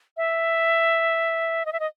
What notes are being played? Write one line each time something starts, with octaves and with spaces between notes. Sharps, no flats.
E5
D#5
E5
D#5